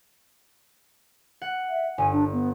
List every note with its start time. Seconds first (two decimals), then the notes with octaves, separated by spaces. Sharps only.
1.42 F#5
1.69 E5
1.98 G1 G#5
2.13 D4
2.32 B3